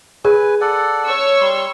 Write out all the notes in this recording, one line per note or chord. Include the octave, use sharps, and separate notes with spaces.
G#4 B4 G#5
A4 D5 F#5
C#5 C#6 E6
G3 C6